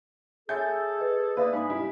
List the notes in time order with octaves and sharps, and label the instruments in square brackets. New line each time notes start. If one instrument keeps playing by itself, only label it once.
[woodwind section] G#4 A4 [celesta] C#5 E5 G#5 [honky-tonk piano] G6
[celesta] B4 D#5
[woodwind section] A#3 D#6 [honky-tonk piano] B4 [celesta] D5 E5 F5
[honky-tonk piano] G#2 [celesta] G#5 D#6 [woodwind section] B5
[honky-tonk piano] G3 E4